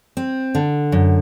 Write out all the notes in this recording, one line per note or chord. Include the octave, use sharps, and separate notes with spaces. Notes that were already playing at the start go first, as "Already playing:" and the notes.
C4
D3
F#2